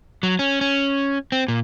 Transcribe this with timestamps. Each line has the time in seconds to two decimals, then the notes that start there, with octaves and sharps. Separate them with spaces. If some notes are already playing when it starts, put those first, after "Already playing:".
0.23 F#3
0.39 C#4
0.61 C#4
1.32 C4
1.48 A#2